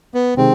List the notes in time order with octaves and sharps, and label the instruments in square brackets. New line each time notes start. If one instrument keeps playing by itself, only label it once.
[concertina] B3
[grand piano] C3 D#3 G#3 [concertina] C4